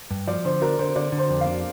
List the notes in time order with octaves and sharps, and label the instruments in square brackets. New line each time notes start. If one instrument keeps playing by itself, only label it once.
[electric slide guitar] G2
[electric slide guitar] F3 [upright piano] D5
[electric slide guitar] D3 [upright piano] C5
[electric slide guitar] D4 [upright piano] A#4
[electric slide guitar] D3 [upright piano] C5
[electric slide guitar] D3 [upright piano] D5
[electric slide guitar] D3
[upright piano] C5
[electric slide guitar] F2
[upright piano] F5
[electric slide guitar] D4